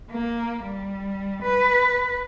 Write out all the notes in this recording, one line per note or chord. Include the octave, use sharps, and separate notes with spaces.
A#3
G3
B4